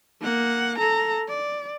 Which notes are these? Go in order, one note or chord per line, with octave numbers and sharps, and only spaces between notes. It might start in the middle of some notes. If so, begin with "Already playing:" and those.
A#3 F#5
A4 A#5
D5